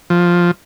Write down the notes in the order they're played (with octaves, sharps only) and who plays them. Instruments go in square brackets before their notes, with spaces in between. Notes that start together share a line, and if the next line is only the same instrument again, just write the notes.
[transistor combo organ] F3